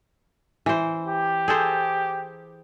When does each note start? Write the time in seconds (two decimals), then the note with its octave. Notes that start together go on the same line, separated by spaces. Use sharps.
0.66 E3 C5
1.07 G4
1.48 G#4 A4 C5